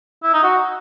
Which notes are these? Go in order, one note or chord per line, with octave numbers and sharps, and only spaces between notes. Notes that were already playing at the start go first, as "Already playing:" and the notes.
E4
D#4
F#4